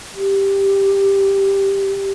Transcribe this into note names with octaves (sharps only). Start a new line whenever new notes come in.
G4